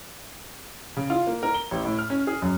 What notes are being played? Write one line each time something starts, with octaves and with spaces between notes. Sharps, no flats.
C#3
F4
A#3
A#4
G7
A1
A2
F6
C#4
G#4
F#2